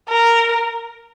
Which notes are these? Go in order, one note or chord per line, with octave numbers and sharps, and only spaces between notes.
A#4